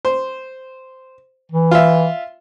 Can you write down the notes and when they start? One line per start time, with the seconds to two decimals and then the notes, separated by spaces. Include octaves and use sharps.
0.05 C5
1.52 E3
1.71 F4 E5